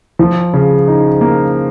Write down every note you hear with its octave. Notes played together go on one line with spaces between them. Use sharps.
F3
C#3
D#4
A#3